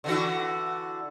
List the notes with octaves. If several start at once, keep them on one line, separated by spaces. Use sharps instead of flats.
D3 E3 F#4